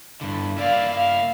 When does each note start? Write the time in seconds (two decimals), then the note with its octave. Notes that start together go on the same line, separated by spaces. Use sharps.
0.21 G2 D3 E4
0.58 A#3 E4 D5 F5
0.91 F5